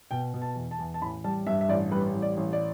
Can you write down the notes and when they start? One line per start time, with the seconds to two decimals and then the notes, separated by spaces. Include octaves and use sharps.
0.11 B2 G5
0.34 B2
0.42 A5
0.56 E2
0.71 A5
0.79 E2
0.94 A5
1.02 A1 B5
1.24 G3 A5
1.46 G2 E5
1.61 E5
1.69 A1 D5
1.92 G3 B4
2.15 A1
2.22 D5
2.37 A1
2.53 D5